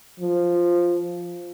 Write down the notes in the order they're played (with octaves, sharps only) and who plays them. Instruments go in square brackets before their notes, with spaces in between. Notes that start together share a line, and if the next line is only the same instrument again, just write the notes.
[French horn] F3